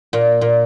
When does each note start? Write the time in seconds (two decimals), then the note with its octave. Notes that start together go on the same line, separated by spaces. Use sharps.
0.13 A#2
0.41 A#2